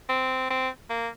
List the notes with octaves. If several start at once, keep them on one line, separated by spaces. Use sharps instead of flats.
C4
C4
A#3